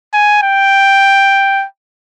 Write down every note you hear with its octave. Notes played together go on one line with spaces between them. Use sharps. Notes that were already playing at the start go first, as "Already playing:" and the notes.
G#5
G5